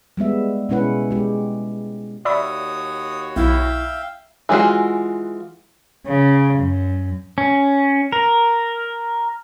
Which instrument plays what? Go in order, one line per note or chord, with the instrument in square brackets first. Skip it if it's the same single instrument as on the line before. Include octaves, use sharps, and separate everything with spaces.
[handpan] G3 G#3 B3 E5
B2 G#3 C#4 E4 B4 F#5
G#3 G4
[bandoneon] D#2 F#4 C#5 [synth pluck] D5 E5 B5 [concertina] D#6
[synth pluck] B1 [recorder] E4 [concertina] E5 F5 G5
[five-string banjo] E3 G#3 C4 F4 F#4
[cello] C#3
F#2
[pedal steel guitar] C#4
A#4